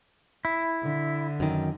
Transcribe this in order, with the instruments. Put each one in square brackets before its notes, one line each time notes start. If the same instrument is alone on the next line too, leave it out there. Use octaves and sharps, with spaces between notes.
[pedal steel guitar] E4
[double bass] D3
[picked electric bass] F#2 D#3